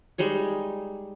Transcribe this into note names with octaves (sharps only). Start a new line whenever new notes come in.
G3 G#3 D#4 C#5